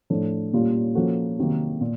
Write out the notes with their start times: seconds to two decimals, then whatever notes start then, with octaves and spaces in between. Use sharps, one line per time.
0.10 A2 F3 A3 D4
0.53 A#2 G3 A#3 C#4 F4
0.95 F3 A#3 C#4 F#4 A4
1.38 C3 D#3 F#3 A#3
1.81 A#2